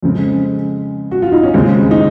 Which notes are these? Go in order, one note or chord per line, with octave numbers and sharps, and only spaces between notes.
F2 C#3 G#3 C4
F#4
F4
D#4
C#4
D#2 C#3 G#3 C4
D#4